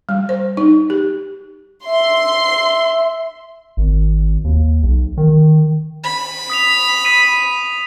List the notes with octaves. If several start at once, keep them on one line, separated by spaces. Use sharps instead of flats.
G3
C5
D#4
G4
E5 C6
G#1
D#2
B1
D#3
B5
D#6 B6 F7
D#6 B6 D#7